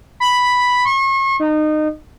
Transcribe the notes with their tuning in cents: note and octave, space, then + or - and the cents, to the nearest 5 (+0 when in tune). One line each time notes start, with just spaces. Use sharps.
B5 +0
C#6 -40
D#4 -25